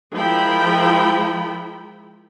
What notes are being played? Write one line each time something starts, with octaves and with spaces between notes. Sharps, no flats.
F3 G#3 E4 A#4 G5 B5